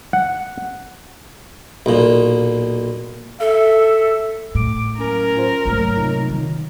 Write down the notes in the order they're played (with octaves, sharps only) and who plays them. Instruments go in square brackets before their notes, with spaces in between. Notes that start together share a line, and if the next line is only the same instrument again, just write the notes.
[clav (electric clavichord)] F#5
[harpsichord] B1 A#2
[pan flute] A4 [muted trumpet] E5
[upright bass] A2 [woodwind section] D6
[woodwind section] F#3 A#3 C#4 [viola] A#4
[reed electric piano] F4 C5
[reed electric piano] C2 G#2 F6 [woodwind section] F#3 [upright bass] A3 A#3
[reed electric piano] C3 D#4 F4
[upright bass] D#3